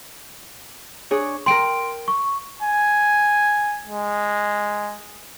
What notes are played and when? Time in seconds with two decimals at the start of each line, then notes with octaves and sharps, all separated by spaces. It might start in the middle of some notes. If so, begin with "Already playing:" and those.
1.11 D4 G#4 C#5
1.46 A#4 G5 C6 D7
2.08 C#6
2.62 G#5
3.86 G#3